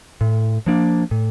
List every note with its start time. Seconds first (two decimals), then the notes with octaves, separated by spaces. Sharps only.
0.21 A2
0.66 F3 A#3 D4
1.11 A2